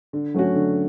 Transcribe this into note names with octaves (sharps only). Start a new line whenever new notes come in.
D3
F#3 A3 C#4 F#4
D3